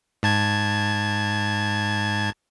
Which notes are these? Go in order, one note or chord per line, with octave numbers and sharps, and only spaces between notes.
G#2 A5 G#6